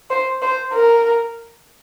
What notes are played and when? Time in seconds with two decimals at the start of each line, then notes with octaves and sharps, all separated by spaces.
0.10 C5
0.42 C5
0.73 A#4